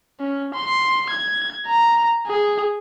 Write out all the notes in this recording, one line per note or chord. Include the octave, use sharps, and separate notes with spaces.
C#4
C6
G#6
A#5
G#4